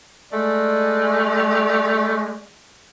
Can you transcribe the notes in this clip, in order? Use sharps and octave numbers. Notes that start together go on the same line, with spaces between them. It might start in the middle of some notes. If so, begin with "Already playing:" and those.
G#3 A3 D5